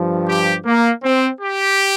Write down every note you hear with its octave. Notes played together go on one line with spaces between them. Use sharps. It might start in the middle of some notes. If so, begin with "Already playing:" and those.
Already playing: G2 F3
G4
A#3
C4
G4